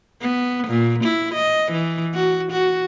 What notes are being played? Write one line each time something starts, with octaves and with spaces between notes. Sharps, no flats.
B3
A#2
E4
D#5
E3
F#4
F#4